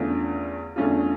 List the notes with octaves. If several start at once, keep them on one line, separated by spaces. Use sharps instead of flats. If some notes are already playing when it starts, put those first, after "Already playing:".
Already playing: E2 D3 A3 C#4 F4
E2 D3 A3 C#4 F4